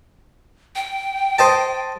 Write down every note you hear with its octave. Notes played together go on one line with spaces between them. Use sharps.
G5
C5 D#5 A5